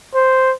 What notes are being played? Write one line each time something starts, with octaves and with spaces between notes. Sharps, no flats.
C5